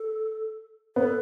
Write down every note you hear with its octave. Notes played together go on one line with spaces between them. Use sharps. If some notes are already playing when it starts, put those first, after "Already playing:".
Already playing: A4
B3 A4